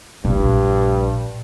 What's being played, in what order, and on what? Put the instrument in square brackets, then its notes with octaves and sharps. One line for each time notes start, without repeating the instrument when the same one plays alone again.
[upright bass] A#1 [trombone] G2